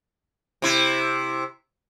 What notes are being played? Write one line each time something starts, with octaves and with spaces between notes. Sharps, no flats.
C3 E4